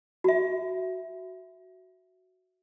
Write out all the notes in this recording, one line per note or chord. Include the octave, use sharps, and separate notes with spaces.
F#4 E5